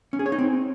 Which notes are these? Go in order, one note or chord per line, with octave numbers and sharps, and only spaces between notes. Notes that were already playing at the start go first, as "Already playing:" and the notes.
C#4
G#4
C#5
D#4
C4